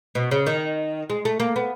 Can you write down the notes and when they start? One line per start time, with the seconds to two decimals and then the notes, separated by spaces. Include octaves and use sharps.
0.15 B2
0.31 C#3
0.46 D#3
1.10 G#3
1.25 A3
1.40 A#3
1.56 B3